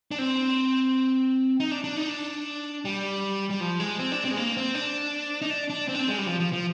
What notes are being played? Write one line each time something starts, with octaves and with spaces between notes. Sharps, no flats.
D4
C4
D#4
D4
D4
D#4
D4
G3
G3
F3
G#3
C4
D4
C4
G#3
A#3
C4
D4
D#4
D4
D4
C4
D4
C4
G#3
G3
F3
F3
F3